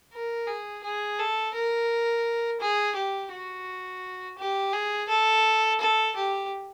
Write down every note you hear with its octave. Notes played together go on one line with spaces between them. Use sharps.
A#4
G#4
G#4
A4
A#4
G#4
G4
F#4
G4
G#4
A4
A4
G4